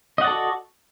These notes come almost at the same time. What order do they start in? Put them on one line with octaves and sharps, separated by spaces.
D#5 F#5 D5 A4 F#4